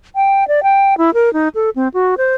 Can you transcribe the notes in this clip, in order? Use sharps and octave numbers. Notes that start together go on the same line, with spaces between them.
G5
D5
G5
E4
A#4
D#4
A4
C4
F#4
C5